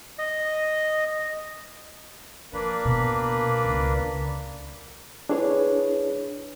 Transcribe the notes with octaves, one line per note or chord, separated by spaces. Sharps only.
D#5
F3 A#3 D4 B4
B2
C#2
D4 E4 G#4 B4 C#5